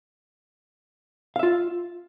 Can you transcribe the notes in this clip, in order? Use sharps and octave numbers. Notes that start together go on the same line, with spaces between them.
F4 E5 F5